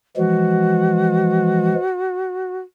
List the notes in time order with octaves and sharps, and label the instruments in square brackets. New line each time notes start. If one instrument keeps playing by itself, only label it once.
[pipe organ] E3 F3 G#3 [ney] F#4